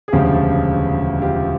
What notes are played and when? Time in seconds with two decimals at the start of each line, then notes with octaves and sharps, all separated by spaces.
0.08 G#4
0.12 E1 D2 C#3 F3 F4 G4
1.22 F4 G4